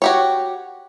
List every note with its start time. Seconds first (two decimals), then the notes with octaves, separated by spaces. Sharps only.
0.02 F#4 G4 C#5